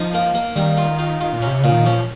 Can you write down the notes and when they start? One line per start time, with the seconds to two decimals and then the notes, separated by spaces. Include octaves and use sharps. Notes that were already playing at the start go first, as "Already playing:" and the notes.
Already playing: F3 D#4
0.14 A#3
0.34 A#3
0.56 D#3 G3
0.77 F4
0.99 F4
1.21 F4
1.33 A#2
1.42 C#4
1.47 C3
1.60 A#2 C#3
1.72 D#3
1.85 F3 C#4